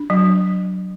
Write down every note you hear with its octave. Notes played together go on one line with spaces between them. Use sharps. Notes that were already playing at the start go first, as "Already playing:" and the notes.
Already playing: D4
F#3